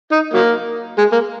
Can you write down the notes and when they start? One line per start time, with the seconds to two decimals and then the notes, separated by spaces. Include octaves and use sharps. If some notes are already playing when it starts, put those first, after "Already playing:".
0.12 D#4
0.34 F#3 A#3
0.98 G#3
1.12 A#3